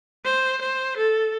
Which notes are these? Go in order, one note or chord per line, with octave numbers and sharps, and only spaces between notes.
C5
C5
A4